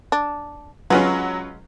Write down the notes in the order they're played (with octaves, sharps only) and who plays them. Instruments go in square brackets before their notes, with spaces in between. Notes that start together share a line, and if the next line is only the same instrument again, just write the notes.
[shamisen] D4
[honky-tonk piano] F#3 [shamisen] G#3 F#4 [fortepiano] C#4 F4 B4